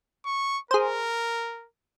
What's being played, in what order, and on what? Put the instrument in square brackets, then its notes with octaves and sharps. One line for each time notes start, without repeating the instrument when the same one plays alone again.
[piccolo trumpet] C#6
[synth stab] G#4 C5 [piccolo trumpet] A#4